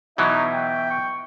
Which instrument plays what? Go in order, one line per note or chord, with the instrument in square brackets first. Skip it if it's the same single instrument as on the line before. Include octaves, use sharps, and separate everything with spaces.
[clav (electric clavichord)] B2 E3 F#3 [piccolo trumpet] D#4 [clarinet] E5
[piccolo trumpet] G5
[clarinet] C#6